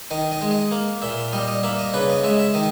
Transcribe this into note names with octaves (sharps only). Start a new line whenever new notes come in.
D#3 D#5
D#5
G#3
D#5
A#3
A#2 E5
G3 D#5
D#5
A#3 E5
D#5
C#3 B4
D#5
G#3 E5
E5
D#3 D#5